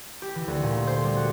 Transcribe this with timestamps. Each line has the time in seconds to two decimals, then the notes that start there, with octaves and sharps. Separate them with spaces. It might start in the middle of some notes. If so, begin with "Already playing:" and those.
0.22 G4
0.35 E3
0.48 D2
0.63 A#2
0.87 C5
1.03 G3
1.17 F#4